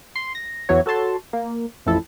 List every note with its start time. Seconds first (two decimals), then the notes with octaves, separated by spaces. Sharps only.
0.15 C6
0.35 A#6
0.69 E2 E3 F#3 C#5
0.86 F#4 A4 C#5 A5 C6
1.33 A#3
1.86 A1 F2 E4 A4